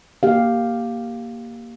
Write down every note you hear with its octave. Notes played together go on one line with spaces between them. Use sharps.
A#3 G4 F5